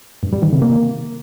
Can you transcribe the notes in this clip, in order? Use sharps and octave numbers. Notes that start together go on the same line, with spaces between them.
G2
G3
D#3
C3
A#3